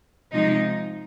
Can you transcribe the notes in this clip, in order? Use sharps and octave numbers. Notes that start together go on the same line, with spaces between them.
C3 F3 G#3 D#4